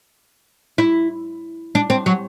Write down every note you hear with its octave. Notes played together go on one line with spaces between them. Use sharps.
E4
D4
C4
F#3